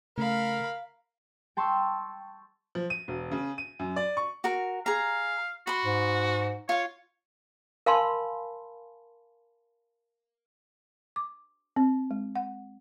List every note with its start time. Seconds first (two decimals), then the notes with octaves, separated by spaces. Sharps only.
0.18 C#3 A3 A#4 F5 B5
1.57 G5 A5 C6 C#6 E6
2.75 F3
2.90 D#7
3.08 E1
3.31 C#3
3.58 D#7
3.79 F#2
3.96 D5
4.17 C#6
4.44 F#4 A#4
4.86 G#4 F5 A#5
5.67 F#4 B5 C6
5.85 G#2
6.69 F4 C#5 F5
7.86 A#4 F5 G#5 A5 B5 C6
11.16 D6
11.76 C4
12.11 G#3
12.36 F#5